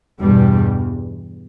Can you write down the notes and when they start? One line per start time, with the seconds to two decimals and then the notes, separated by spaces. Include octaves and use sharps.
0.21 E2 G2 B2 G3